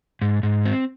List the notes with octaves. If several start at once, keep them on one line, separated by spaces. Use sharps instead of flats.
G#2
G#2
C4